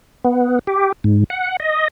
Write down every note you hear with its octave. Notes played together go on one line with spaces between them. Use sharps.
B3
G4
G#2
F#5
D#5